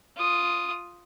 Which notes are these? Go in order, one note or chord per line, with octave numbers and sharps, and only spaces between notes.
F4 D#6